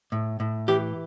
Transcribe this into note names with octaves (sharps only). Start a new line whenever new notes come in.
A2
A2
E3 G4